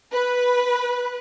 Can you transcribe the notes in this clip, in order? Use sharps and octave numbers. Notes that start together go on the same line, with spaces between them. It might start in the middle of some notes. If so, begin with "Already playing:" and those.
B4